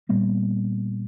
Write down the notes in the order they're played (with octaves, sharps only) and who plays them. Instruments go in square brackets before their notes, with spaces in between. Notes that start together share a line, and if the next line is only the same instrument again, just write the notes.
[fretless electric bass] A#2 G3 A#3 B3